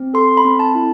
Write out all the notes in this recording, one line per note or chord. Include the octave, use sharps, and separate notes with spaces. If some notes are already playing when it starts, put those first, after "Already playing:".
Already playing: C4
A4 C6
B5
C4
A5
E4